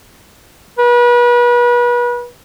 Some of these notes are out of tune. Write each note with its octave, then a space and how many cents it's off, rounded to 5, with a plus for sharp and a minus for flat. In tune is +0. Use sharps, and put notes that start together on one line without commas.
B4 -35